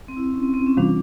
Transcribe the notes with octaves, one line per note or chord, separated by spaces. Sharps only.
C4
E4
C#4
C4
C4
C#4
C3 E3 G3 C4 D4 F4